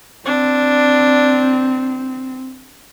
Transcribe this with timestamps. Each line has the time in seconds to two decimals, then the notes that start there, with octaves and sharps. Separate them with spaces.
0.26 C4 D4